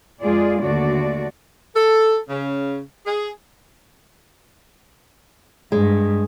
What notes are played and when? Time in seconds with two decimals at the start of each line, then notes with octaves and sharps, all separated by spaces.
0.22 F2 G#3 F4 G#4 D5
0.63 D#2 D3 A3 F#4 D5
1.75 A4
2.29 C#3
3.06 G#4
5.72 G2 G#3